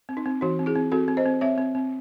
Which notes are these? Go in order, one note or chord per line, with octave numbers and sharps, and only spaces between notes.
C4
D#4
C4
E3 D#4 F#4
C4
E4 G#4
C4
C4 F#4 A4
C4
C5 D#5
C4
C4 C#5 E5
C4
C4